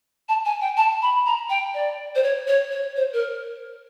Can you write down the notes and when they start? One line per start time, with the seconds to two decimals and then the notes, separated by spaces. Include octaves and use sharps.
0.29 A5
0.45 G#5
0.61 G5
0.77 A5
1.02 B5
1.26 A#5
1.50 G5
1.74 D5
2.15 C5
2.23 C#5
2.48 C#5
2.71 C#5
2.96 C5
3.13 A#4